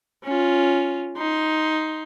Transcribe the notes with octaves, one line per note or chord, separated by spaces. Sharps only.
C#4 F4
D#4 C6